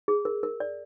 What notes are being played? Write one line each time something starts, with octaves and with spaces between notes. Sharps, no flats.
G#4
A#4
A#4
D5